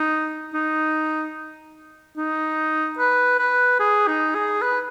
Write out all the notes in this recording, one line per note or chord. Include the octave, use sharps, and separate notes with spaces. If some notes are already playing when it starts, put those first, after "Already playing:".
Already playing: D#4
D#4
D#4
B4
B4
G#4
D#4
G#4
B4